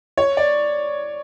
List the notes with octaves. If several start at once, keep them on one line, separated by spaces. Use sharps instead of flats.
C#5
D5